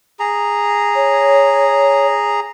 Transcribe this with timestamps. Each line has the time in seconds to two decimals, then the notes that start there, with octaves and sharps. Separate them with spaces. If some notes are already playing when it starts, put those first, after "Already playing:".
0.20 G#4 A#5
0.96 C#5